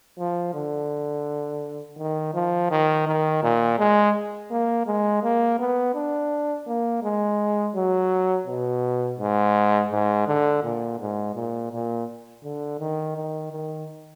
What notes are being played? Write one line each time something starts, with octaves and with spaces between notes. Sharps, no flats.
F3
D3
D#3
F3
D#3
D#3
A#2
G#3
A#3
G#3
A#3
B3
D4
A#3
G#3
F#3
B2
G#2
G#2
D3
A#2
G#2
A#2
A#2
D3
D#3
D#3
D#3